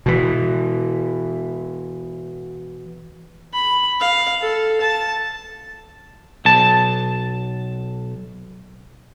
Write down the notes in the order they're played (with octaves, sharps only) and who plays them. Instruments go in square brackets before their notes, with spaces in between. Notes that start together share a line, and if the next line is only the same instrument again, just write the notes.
[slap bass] B2 E3
[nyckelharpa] B5
F5
A4
A5
[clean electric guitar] B1 A5